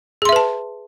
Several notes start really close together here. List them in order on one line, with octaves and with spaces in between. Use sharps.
G#4 C6 E5 B4 A5